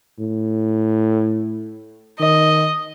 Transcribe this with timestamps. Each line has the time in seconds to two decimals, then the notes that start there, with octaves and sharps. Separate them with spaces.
0.19 A2
2.20 D#3 D#5